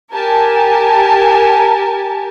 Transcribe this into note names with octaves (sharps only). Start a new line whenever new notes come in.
G4 A#4 G#5 A5